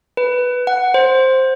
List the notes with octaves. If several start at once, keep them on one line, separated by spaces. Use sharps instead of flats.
B4
F#5
C5